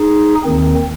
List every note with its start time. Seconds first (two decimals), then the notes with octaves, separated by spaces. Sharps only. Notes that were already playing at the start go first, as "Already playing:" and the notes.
Already playing: D#4 G#4
0.44 D#2 D#3 C4